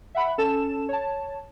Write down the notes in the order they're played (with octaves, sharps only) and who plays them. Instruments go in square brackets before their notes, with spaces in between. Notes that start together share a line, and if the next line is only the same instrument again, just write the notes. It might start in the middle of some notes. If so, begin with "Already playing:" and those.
[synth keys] E5 F#5 B5
C#4 A4 A5 E7
C#5 A5